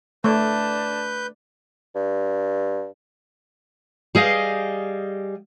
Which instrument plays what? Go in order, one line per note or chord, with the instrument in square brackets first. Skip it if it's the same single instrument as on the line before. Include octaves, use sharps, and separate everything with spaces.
[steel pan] A3 [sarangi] D4 [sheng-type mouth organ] B4 G6
[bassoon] G2
[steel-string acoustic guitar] G3 G#4 D#5 F5